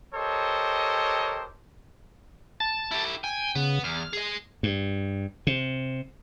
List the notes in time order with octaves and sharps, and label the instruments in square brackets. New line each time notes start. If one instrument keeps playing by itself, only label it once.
[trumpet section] G4 A4 A#4 C5 C#5 D#5
[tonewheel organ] A5 A6
[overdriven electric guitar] E4 G4
[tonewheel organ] G5 [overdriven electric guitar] G#5
[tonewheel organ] C#3 [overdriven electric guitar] B3
[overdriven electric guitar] E2 [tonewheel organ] F6
[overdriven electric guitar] G#4 D#5
[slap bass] G2
C3